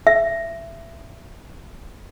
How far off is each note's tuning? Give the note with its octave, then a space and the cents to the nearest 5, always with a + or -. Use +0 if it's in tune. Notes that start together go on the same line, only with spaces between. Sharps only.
E5 +20